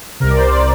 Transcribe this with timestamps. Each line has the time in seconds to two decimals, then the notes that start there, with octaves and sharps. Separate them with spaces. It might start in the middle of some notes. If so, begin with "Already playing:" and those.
0.20 C2 C3 A#4
0.30 D5
0.36 C5
0.52 D5